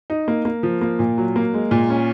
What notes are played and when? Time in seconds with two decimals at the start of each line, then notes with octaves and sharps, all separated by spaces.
0.10 D#4
0.28 A#3
0.45 A#3
0.63 F3
0.81 A#3
0.99 A#2
1.18 F#3
1.36 A#3
1.54 G#3
1.71 A#2
1.90 C#4